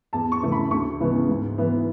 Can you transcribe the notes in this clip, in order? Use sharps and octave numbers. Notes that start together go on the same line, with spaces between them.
E2 A5
C#6
C#3 E3 A3
B5
D2 C#6
C#3 E3 G#3 B3
G#2
E3 B3